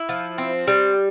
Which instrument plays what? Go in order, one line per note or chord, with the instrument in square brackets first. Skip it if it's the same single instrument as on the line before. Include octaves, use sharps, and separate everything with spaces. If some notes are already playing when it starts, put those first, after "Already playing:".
Already playing: [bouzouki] E4
F3
C4
G3